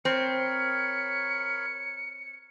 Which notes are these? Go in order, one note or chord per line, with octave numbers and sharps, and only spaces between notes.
C4 A#4 C#5 B5 C#7